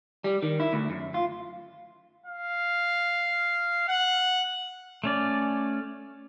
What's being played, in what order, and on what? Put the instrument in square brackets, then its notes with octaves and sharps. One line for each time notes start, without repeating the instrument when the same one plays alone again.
[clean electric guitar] G3
D#3
E4
D2
F#2
F4
[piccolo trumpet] F5
F#5
[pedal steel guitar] A3 C#4 D5